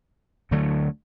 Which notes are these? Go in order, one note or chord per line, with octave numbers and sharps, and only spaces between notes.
D2 D3 F#3 A3